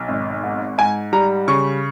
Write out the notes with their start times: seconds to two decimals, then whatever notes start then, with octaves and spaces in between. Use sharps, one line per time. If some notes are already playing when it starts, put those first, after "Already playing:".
Already playing: B1
0.08 G#1
0.44 G#2
0.78 G#2 G#5
1.13 G3 A#5
1.48 C#3 C#6